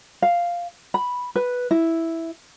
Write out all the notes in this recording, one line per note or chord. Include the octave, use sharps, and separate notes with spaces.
F5
B5
B4
E4